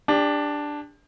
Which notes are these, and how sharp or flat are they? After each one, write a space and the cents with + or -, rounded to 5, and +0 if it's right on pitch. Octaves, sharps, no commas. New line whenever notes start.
D4 +0 G4 +35